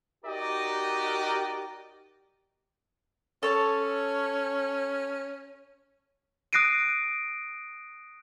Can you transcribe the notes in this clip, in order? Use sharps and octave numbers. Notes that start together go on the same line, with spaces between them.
D#4 F#4 G4 A#4 D5 D#5
C#4 A4 C#5 A5
D#6 F#6 A#6 C7 D7 D#7